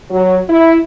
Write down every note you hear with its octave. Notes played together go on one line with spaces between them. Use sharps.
F#3
E4